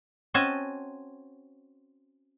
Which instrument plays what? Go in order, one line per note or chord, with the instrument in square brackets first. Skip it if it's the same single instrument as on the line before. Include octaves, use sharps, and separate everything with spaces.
[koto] C4 C#4 F#4 D#5 G#5 A5